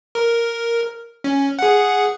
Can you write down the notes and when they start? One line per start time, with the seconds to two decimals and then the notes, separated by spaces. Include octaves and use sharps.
0.15 A#4
1.24 C#4
1.59 G#4 F#5